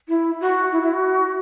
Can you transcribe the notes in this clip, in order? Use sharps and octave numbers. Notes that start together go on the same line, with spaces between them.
E4
F#4
E4
E4
F#4